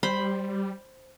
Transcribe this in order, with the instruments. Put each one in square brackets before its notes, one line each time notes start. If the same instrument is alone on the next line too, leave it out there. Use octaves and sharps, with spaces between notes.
[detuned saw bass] G3 [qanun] C5 B5